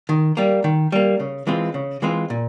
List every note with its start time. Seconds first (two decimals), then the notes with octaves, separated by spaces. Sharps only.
0.09 D#3
0.37 G3 A#3
0.64 D#3
0.92 G3 A#3
1.20 C#3
1.47 E3 G#3 C4 F4
1.74 C#3
2.02 E3 G#3 C4 F4
2.30 A#2